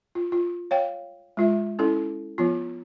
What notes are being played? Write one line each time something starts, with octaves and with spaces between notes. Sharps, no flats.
F4
F4
C#5 F5 G5
G#3 F4 E5
C#4 E4 A4
F3 B3 F4